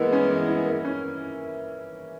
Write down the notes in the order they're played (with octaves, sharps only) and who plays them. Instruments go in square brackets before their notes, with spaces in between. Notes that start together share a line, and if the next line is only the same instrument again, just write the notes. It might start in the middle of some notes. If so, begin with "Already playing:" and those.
Already playing: [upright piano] E3 A#3 E4 [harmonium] G#3 B3
[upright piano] C#4
E3
E4
A#3
C#4